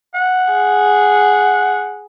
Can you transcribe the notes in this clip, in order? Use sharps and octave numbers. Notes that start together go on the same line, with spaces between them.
F#5
G#4